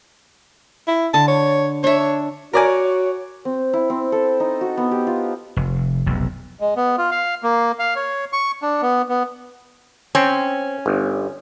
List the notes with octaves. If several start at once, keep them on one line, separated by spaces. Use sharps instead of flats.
E4
D3 A5
C#5
D4 C#5 E5
F#4 A#4 C#5 D5 G#5
C4
E4
C4
A4
D#4
F#4
B3
G4
F4
F1
F1 B1 E2
G#3
B3
F4
F5
A#3
F5
C#5
C#6
D4
B3
B3
C4 C#4
G1